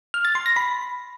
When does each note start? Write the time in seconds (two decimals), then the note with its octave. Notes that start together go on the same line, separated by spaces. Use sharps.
0.14 F6
0.25 A6
0.35 C6
0.46 A#6
0.56 B5